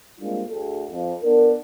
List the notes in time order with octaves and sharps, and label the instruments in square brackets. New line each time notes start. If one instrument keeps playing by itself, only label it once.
[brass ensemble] G3 G#3 A#3 C4 D4 F4
D2 G#4 A4
F2
B3 D4 A#4